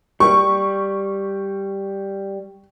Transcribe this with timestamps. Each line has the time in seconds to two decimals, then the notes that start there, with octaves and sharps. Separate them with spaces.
0.20 G3 C#6